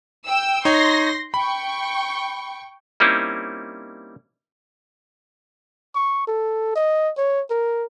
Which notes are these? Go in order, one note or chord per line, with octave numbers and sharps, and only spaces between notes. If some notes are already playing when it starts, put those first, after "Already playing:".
G5 E6
D#4 C#5 C6 A#6
G5 B5 C#6
G3 A#3 C4 C#4 D#4 E4
C#6
A4
D#5
C#5
A#4